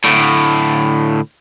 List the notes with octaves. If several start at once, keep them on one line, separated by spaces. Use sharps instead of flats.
D2 A2